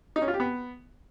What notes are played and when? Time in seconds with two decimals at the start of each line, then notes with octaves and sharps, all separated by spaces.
0.16 D#4
0.22 C#4
0.28 F4
0.34 G4
0.40 B3